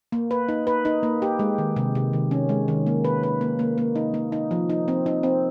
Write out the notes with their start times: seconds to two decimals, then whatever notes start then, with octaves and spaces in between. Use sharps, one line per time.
0.12 A#3
0.31 B4
0.49 D#4
0.67 B4
0.85 D#4
1.03 A#3
1.22 G4
1.39 G#3
1.58 D#3
1.76 C3
1.95 C3
2.13 D#3
2.31 C#4
2.49 G#3
2.68 D#3
2.87 A#3
3.05 B4
3.23 B4
3.41 A#3
3.59 A#3
3.78 A#3
3.96 D#4
4.14 A#3
4.32 D#4
4.51 F3
4.70 D#4
4.88 C4
5.06 D#4
5.23 C4